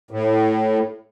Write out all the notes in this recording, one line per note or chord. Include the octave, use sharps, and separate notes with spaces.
A2